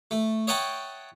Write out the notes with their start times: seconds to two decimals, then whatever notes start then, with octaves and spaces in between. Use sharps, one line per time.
0.11 A3
0.47 C#5 D#5 E5 F#5 G5 A5